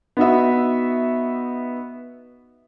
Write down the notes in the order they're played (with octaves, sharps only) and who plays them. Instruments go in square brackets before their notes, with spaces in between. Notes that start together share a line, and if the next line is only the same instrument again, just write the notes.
[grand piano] B3 D#4 F#4 E5